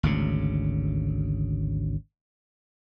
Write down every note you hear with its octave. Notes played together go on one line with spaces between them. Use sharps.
G#1 D2 C#3